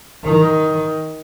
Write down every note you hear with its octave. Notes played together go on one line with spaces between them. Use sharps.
D#3